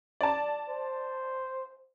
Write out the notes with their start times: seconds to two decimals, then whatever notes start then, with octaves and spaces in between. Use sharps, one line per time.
0.21 D5 A5
0.70 C5